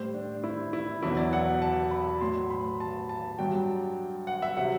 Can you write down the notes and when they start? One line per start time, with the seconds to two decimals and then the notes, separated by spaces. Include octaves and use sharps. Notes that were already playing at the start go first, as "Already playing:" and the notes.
Already playing: A2 G3 C5
0.14 D4
0.44 E4
0.73 E4
1.02 E2 B2 F#3 E4
1.17 D5
1.33 F#5
1.62 A5
1.91 B5
2.21 A2 F#3 C6
2.50 B5
2.80 A5
3.09 A5
3.38 G2 F#3 G5
4.27 F#5
4.42 E5
4.57 C3 F#3 F#5